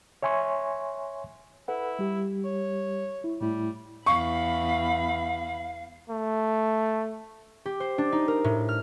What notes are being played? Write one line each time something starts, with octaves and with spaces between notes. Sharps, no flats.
C#5 E5 G#5 C6 C#6
E4 A4 B4 F#5
G3 G4
C#5
E4
A2 G3 A3 E4
E2 F5 B5 C#6
A3
G4
C5
D4
D#4
A#4
A2
F6